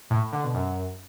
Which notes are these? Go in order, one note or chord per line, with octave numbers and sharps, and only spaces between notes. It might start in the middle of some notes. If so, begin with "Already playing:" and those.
A2
A2
D3
B2
F#2